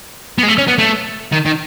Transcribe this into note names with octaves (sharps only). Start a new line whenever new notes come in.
B3
G#3
A3
C#4
B3
A3
D#3
D#3